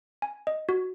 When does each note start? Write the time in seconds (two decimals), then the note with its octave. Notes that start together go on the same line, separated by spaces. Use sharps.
0.22 G#5
0.47 D#5
0.69 F#4